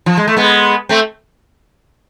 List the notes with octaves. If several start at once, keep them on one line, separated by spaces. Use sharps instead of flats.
F3
G#3
A3
G#3 B3
A3 C4